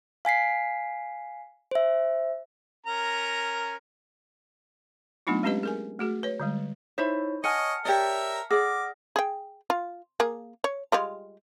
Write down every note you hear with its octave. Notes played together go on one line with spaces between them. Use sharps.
F5 G#5 B6 C7
C5 E5
C#4 A#4 A#5
F#3 A3 B3 D4 D#4 F4
G#3 C4 C#4 G4 B4 D#5
G#4 A#4 G#5
A3 F#4 G#4
B4 C#5
D3 G3 G#3
D#4 E4 C5 C#5 E5 B5
C#5 D#5 F#5 G#5 A5 F6 C#7
G4 A#4 C#5 D5 E5 A#5
G#4 D5 F#5 D6 F6 A#6
G#4 G5
F4
A#3 G#4
C#5
G3 G#3 F4